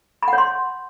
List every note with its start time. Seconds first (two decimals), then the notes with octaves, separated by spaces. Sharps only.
0.23 B5
0.28 F#5
0.33 C#5
0.38 C6